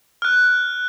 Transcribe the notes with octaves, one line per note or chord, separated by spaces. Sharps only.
F6 F#6